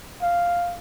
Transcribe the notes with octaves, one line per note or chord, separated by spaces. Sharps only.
F5